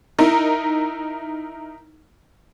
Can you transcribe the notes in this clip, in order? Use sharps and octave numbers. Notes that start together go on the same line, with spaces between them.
D#4 E4 A#4